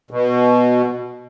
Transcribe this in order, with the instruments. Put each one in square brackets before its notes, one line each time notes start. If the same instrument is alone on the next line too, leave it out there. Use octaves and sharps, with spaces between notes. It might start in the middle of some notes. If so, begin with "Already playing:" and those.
[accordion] B2